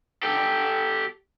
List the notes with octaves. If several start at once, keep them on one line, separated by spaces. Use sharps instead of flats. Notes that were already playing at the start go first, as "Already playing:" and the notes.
G4 A4